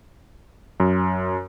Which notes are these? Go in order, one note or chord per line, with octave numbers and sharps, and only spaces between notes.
F#2